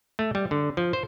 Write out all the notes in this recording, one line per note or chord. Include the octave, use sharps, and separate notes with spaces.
A3
G3
D3
F3
C5